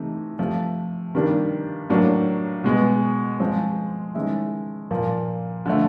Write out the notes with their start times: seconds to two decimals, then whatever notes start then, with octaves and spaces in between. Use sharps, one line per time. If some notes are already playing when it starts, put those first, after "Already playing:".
Already playing: C3 E3 A3 C4 D#4
0.39 C3 F3 A3
1.15 C3 D#3 G3 A#3 D4
1.89 A2 F#3 A#3 D4
2.64 B2 G#3 B3
3.40 F3 G#3 C4
4.15 D#3 G#3 C#4 E4
4.91 A#2 F3 A#3
5.66 D3 F3 A3